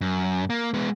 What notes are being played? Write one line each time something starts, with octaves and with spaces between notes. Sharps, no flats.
F#2
A#3
G#3 B3